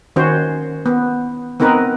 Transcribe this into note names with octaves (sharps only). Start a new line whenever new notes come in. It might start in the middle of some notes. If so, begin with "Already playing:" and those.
D#3 C#4 F#4 C5
B3
B3 C4 D#4 A#4 B4